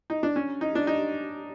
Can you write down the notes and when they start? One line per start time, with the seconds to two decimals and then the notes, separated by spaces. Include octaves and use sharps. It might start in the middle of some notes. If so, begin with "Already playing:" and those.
0.10 D#4
0.23 D4
0.36 C#4
0.61 D#4
0.75 D4
0.87 D#4